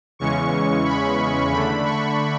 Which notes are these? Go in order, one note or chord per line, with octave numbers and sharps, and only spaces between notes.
E2 C#3 E3 G#3 C#4 C#6
B5
D3 A3 D4 B5
C#6